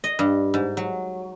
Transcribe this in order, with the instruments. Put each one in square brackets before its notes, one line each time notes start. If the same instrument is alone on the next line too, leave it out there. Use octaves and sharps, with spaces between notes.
[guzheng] D#5
G2
G#2
F#3